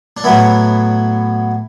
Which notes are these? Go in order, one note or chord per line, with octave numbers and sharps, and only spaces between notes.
D4
A2 F#3 B3 E4